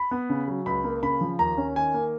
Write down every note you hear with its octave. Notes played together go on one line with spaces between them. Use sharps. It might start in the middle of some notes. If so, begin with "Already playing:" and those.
Already playing: B5
B3
C#3
F#3
C#2 B5
A#3
C#3 B5
F3
D#2 A#5
C#4
D#3 G#5
A#3